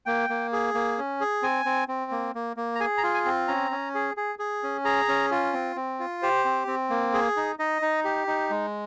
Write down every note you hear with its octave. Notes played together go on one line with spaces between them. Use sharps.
A#3 G5
A#3
G#4
A#3
C#4
G#4
C4 G#5
C4
C4
A#3
A#3
A#3
A#5
G#4 G#5
A#5
F4
G#5
C4
C#4 A#5
C#4
G#4
G#4
G#4
C#4
G#4 A#5
C#4
F4
C4
C4
F4
G4 C5
C4
C4
A#3
G#4
D#4
D#4 D#5
D#4
G4
D#4
G#3